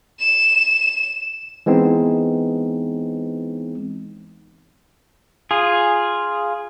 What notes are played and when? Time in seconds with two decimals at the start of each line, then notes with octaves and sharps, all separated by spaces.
0.19 E7
1.66 E3 G#3 B3 C4 D#4
5.51 F4 G#4